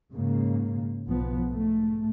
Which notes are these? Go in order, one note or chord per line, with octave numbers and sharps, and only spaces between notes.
G#2 C#3 A#3
B1 F3 B3
G#2 A3